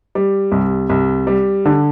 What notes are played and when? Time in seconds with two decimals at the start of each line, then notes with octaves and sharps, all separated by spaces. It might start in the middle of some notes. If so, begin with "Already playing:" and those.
0.15 G3
0.52 C2
0.90 C2
1.27 G3
1.65 D3